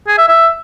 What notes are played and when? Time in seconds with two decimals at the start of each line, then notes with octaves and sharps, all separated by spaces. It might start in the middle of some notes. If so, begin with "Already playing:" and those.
0.08 G#4
0.18 E5
0.28 E5